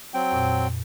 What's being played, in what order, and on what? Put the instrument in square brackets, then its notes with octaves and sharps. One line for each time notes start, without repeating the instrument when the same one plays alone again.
[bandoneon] F#3 C4 G5
[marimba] F2 A#2